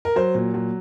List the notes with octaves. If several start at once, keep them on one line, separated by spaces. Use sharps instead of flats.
A#4
F#3 C5
A#2
F#3